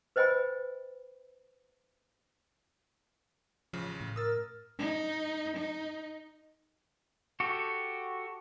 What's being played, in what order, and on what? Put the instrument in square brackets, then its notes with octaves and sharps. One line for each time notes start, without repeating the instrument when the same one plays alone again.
[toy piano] B4 C5 D#5 G5 G#5 B5
[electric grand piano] A1 C#3 [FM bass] F3
[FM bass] A2
[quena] A#4 [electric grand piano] D#6 E6 A6
[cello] D#4
D#4
[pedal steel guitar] F#4 G4 A4